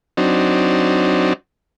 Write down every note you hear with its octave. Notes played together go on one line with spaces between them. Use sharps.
F#3 C4 D4 D#4